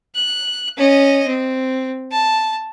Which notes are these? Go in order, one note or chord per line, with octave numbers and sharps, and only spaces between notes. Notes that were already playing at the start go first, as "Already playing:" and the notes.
F#6
C#4 D#5
C4
A5